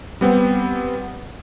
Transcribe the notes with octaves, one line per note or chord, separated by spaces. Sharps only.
G3 B3 C4